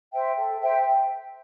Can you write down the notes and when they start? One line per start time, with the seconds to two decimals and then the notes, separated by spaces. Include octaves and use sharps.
0.12 C5 E5 G5
0.37 A4
0.62 C5 E5 G5